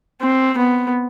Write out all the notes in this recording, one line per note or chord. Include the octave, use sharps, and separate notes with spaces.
C4
B3